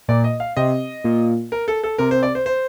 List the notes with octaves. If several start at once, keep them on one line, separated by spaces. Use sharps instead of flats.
A#2 D5
D#5
F5
C3 D#5
A#2
A#4
A4
A4
C3 A#4
C5
D5
C5
C5